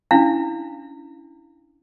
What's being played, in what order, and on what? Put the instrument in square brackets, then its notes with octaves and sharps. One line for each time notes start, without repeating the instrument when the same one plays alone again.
[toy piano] C#4 D4 E4 F5